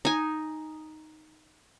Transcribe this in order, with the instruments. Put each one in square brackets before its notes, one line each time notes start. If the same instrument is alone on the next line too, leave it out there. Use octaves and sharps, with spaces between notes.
[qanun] D#4 G#5